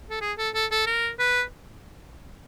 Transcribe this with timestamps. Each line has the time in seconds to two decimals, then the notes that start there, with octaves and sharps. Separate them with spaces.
0.10 A4
0.21 G#4
0.38 A4
0.54 A4
0.71 A4
0.87 A#4
1.19 B4